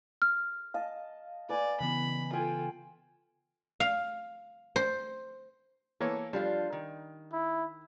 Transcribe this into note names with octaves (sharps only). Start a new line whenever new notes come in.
F6
D#5 F5 A5
B4 D5 G#5
C#3 E3 B3 B5
F4 A4 G5 G#5
F5
C5
E3 A#3 A4 C#5
F3 G3 D4 F4
D#3
E4